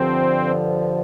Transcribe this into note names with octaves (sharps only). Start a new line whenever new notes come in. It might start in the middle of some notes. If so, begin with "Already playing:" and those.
Already playing: G2 D3 F3 C4